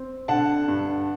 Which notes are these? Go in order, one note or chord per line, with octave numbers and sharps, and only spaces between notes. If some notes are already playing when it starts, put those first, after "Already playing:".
Already playing: C4
D3 F#5 A5
G2